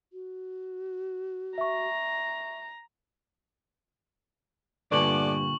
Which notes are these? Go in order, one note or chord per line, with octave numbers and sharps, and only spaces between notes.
F#4
E5 A#5 C#6
G2 A#2 D3 A3 B3 D5 C#6 F#7